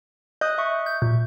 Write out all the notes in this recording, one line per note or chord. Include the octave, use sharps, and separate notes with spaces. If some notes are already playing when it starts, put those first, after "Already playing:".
D#5 D#6 F#6 G6
E5 C#6
G6
A#2